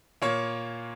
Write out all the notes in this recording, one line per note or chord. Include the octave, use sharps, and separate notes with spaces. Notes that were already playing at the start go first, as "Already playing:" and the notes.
A#2 A#3 C#5 F5